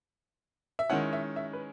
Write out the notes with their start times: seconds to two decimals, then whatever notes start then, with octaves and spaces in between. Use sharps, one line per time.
0.79 E5
0.89 D#3 G#3 C#4 E4 F#5
1.13 E5
1.36 E5
1.53 B4